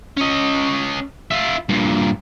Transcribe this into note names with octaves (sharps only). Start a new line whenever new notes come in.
C#4 D#5
F4 E5
G2 A#2